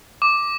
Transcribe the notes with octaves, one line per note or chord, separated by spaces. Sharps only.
D6